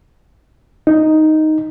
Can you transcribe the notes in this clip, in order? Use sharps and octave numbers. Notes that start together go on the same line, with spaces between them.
D#4